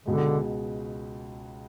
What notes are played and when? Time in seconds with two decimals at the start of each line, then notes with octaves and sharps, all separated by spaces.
0.06 C#2 B2 D3 G#3